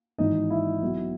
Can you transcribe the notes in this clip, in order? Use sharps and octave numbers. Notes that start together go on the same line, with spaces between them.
G#1 G#2 E3 D#4 D#5
E4 E5
B1 B2